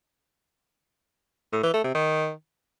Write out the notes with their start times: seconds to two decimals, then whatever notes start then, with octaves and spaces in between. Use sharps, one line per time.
1.53 A2
1.63 E3
1.74 A3
1.84 C3
1.95 D#3